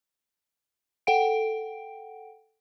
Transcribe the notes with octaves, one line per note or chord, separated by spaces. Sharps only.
A4 F#5 G5 D7